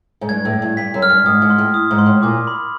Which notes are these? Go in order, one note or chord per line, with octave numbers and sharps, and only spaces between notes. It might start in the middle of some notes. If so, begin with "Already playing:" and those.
G#2
G2 G#6
A2
G#6
G2
G2 B6
F#2
F6
G2
G#2 D#6
G#2
C6
A2
D#6
G#2
C6
A2
A#2 D6
B5